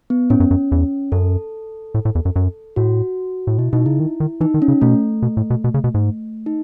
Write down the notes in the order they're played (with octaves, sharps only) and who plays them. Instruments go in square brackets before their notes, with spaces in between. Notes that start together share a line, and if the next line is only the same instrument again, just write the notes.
[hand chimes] B3
[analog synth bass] A2 [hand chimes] C#4
[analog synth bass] F#2
F#2
E2
[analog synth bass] F#2 [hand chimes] A4
[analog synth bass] A2
A2
E2
F#2
F#2
[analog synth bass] A2 [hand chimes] F#4
[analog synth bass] A2
[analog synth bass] B2 [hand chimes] E4
[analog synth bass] B2 [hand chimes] D#4
[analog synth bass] C#3 [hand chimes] E4
[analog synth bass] D#3
D#3
[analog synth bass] E3 [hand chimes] D#4
[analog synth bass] D#3
[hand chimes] C#4
[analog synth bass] C#3
[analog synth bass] B2 [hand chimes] A3
[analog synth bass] B2
A2
B2
[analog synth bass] B2 [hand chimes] A3
[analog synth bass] C#3
B2
G#2
[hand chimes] D#4